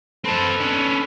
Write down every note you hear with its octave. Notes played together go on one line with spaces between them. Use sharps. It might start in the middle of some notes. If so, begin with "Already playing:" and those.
C4 A4 B4 A5
C#4 D4